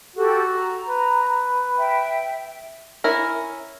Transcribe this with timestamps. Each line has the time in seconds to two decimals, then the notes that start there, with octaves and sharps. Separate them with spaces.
0.17 F#4 G4 A4
0.56 A#5
0.89 B4
1.77 E5 G5
3.04 C#4 E4 A#4